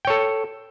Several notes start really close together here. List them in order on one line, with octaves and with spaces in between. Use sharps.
G5 C#5 A4